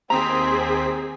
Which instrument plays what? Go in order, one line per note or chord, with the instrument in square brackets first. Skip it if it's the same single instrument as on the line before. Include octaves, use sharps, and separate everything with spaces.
[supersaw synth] D#2 C4 B6 [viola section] G#4 [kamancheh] C5 [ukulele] A#5